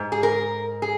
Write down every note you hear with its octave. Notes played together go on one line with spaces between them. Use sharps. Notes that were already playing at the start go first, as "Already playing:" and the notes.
Already playing: G#2
G#4
A#4
G#4